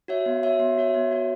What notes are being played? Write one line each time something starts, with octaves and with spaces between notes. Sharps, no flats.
F#4 C#5 E5
B3
F#4 C#5 E5
B3
F#4 C#5 E5
B3
F#4 C#5 E5